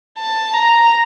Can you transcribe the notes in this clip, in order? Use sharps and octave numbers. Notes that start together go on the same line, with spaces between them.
A5
A#5